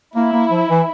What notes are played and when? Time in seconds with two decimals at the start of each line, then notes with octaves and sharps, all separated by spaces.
0.16 A#3 E4
0.33 A#3
0.51 F3
0.69 E3